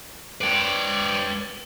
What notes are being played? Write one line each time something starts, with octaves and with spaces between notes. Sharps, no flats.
B4 C#5 D5 G5